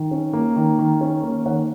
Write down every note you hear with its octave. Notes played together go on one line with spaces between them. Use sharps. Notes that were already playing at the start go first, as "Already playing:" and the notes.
Already playing: D#3
C#4
A#3
D#3
D#3
C#4
A#3
D#3 C#5 F#5